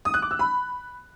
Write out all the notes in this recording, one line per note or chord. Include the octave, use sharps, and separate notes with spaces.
D#6
F#6
D6
E6
B5